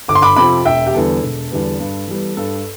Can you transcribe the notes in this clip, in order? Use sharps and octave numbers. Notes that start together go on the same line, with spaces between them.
G1 D6
C6
B5 D6
F2 C3 F3 C4 B5 D6
E1 E5 G5
G4
E2 D3 G3 B3 A4
E1
E2 D3 G3 B3
G2
E3 G3 B3
G2 A4